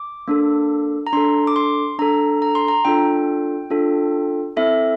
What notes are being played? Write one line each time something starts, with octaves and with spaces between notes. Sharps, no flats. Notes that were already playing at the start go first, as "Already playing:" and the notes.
Already playing: D6
A#3 D4 A4
A#5
D4 A4 C6
D6
C6
D4 A4 A#5
A#5
C6
A#5
D4 F4 A4 G5
D4 F4 A4
C4 E4 A4 E5